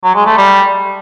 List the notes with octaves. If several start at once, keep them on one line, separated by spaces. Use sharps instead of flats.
F#3
G#3
A3
G3